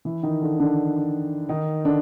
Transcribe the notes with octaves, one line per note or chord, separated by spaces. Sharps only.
E3 E4
D#3 D#4
D3 D4
D3 D4
D#3 D#4
D3 D4